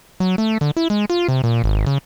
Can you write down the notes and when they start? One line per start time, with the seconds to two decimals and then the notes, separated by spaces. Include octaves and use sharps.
0.20 F#3
0.38 A3
0.61 D3
0.77 E4
0.90 G#3
1.10 F4
1.28 C3
1.44 A#2
1.64 G#1
1.87 C#3